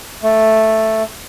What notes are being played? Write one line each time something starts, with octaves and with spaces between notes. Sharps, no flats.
A3